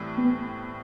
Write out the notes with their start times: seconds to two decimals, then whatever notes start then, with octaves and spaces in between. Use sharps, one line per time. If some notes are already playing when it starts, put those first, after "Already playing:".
Already playing: A2 E3 G3 C4
0.18 B3